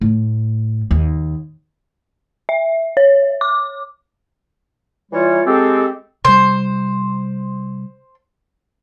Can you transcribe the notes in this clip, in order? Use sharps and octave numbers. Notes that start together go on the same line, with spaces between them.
A2
D#2
E5
C#5
D6
E3 G3 F4 C#5
G#3 C4 G4 A4
C3 G3 C5